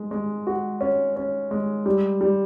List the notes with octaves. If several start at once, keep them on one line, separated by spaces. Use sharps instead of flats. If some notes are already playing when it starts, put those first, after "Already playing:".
Already playing: G#3
G#3
F#4
C#4
C#4
G#3
G3
G3